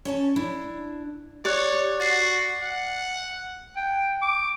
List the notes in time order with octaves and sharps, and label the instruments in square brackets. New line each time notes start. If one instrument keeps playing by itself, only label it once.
[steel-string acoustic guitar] C#4 C#5 A5
D4 E4
[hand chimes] G4 F#6 [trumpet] C#5 [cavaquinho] D5
[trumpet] F#4 [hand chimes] A6 C7
[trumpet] F#5
[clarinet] G5
D6